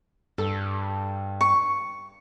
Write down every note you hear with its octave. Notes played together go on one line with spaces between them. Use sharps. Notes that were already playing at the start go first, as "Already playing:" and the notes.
G2 A4
C#6